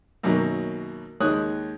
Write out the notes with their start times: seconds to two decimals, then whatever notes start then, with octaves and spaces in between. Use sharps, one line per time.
0.23 F#2 B2 D#3 F#3 A#3
1.20 D#2 D#3 G#3 C#5 D#6 F#6